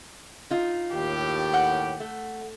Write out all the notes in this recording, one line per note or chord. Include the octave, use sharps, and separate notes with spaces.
D#4 F4
D#2 A2 G4
F#5 G6
A3